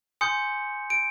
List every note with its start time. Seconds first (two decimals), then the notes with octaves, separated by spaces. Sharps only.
0.21 G#5 C6 D#6 G6 C#7
0.90 D7